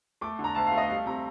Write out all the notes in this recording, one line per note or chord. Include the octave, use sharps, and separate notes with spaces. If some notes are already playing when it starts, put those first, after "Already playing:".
A3 D6
D3
A#5
D2 A5
F5
A3
D#5
G3 F5
C3 A#5